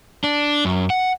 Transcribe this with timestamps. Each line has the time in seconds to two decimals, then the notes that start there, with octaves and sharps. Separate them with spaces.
0.24 D4
0.65 F#2
0.90 F#5